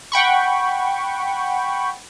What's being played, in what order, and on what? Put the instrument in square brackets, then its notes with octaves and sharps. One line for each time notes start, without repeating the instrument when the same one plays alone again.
[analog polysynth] F#5 G5 B5 C#6